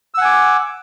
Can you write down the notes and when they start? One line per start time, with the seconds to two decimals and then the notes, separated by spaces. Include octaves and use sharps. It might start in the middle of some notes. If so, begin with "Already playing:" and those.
0.14 E6
0.18 F#5
0.21 G#5
0.25 D6